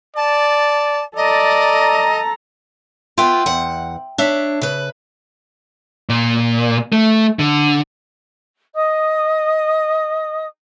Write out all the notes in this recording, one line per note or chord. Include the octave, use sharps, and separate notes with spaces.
D5 A5
A4 D5 D#5 A#5
B3 F4 E5 G5 C6
E2 F#5
D4 C#5 E5 B6
C#3 B4
A#2
A3
D3
D#5 D#6